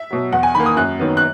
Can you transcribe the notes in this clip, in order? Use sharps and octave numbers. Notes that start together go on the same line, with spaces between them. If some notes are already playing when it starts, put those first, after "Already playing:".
Already playing: E5
B2 F#3
E2 F#5
G#5
D#3 A#3 B5
D#6
F#2 F#6
D#3 F#3 B3
F#6